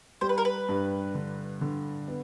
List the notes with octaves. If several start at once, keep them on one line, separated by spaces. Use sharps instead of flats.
G3 C5
B4
A#4
B4
G2
D3
D3
B3